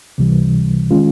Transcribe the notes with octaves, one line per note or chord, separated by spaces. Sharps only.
C#2 C3 E3 G3
D#3 G#3 C#4 F4